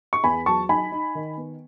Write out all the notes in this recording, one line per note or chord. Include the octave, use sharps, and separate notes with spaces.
C#6
E2 G#5 B5
F#3 A5 C#6
D#4 G#5 B5
D#4
D#3
B3